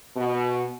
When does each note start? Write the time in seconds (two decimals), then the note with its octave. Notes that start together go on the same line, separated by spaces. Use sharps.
0.16 B2